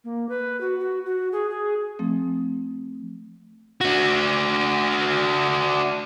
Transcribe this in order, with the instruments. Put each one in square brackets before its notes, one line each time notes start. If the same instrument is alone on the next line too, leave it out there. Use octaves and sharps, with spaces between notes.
[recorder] A#3
B4
F#4
F#4
F#4
G#4
G#4
[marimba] F3 A3 C4
[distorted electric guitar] D4 F#4